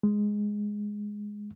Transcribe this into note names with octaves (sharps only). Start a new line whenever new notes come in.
G#3